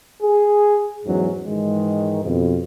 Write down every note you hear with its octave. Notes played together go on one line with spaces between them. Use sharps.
G#4
E2 G#2 F#3 C#4
G#2 D#3 E3 G#3
F2 B2